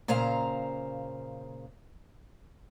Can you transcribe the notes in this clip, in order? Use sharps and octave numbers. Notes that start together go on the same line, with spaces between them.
A#2 C#3 C5 F5 A#5